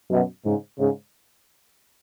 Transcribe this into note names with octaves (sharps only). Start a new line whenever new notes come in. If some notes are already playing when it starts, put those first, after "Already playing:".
F#2 B2
G#2 C#3
G#2 C#3